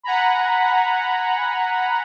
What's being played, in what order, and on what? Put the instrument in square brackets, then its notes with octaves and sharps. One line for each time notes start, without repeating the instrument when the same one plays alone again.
[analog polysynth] F#5 G#5 A#5 B5